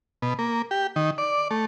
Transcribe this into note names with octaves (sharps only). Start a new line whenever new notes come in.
B2
A#3
G4
D#3
D5
A3